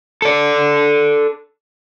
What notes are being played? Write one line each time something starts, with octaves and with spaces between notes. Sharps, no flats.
A4 D5